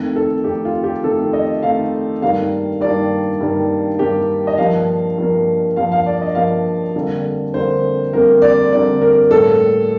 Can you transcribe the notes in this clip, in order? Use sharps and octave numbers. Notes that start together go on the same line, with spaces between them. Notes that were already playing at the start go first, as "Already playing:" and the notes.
Already playing: F2 D#3 A3
A4
F2 D#3 A3 G4
F4
G4
F2 D#3 A3 A4
D#5
F2 D#3 A3 F5
G2 D#3 G3 A#3 F5
G2 D#3 G3 A#3 D5
G2 D#3 G3 A#3
G2 D#3 G3 A#3 G4
D#5
G2 F3 A#3 F5
G2 F3 A#3
G2 F3 A#3 F5
F5
D5
D#5
G2 F3 A#3 F5
F2 D3 G3 A#3
F2 D3 G3 A#3 C5
F2 D3 G3 A#3 A#4
D5
F2 D3 G3 A#3 D5
A#4
A2 G3 A#3 A4